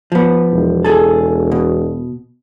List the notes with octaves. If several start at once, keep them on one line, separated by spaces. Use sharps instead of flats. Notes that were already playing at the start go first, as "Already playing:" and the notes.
F3 B3
E1
G#4 A4
B2